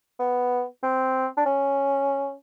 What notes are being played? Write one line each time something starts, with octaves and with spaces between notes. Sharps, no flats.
B3
C4
D4
C#4